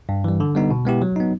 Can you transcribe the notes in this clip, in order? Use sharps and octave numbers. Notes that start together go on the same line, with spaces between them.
G2
E3 G3
D3
G3 B3 D#4
B2
G#3 B3 E4 G4
F#3
B3 D#4